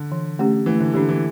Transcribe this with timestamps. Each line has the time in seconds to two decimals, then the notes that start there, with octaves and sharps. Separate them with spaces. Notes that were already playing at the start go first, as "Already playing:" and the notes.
Already playing: D3
0.12 E3
0.39 A3 C#4 G4
0.66 E3 A3
0.80 D3
0.94 D3 D4 G4
1.09 E3